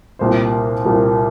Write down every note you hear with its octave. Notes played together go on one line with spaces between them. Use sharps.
C2 A#2 A#3 G4 C5
C2 A#2 A#3 G4 C5